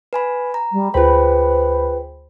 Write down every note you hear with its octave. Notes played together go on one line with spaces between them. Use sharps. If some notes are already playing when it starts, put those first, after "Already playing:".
B4 G#5 B5
A#5
G3
D2 F4 G#4 B4 C5 G5 B5